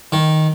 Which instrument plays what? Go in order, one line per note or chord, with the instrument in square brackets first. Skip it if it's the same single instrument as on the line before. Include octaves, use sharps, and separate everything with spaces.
[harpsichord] D#3